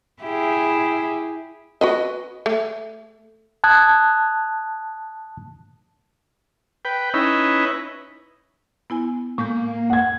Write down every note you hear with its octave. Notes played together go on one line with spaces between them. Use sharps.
E4 G4 G#4
F#4 B4 D#5
A3
A5 D#6 F#6 G#6
B4 G5
C#4 D#4 E4 B4
B3 E4 G#5
A2 G#3 A#3 G6
F#5 G#6